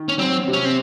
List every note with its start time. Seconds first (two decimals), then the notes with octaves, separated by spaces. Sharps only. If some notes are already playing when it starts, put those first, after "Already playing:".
Already playing: D#3
0.09 C#4
0.19 F#3 C4
0.48 C3
0.53 C#4
0.65 C4